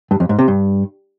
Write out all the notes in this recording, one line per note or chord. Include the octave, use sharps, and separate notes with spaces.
G2
F2
G#2
C3
G2